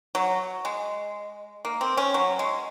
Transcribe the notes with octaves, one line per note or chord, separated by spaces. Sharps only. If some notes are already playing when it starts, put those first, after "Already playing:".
F#3
G#3
A#3
C4
C#4
F#3
G#3